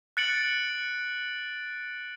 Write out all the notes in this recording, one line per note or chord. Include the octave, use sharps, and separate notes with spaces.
F#6 A6 C#7 D7 F#7